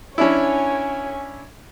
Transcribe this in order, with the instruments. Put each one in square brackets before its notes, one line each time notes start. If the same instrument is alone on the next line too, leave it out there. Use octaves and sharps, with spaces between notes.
[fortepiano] C#4 D4 E4 [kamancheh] C#5 G#5